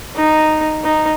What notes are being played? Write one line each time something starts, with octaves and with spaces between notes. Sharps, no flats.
D#4
D#4